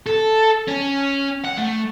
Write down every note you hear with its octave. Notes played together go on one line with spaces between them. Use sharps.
A4
C#4
F#5
A3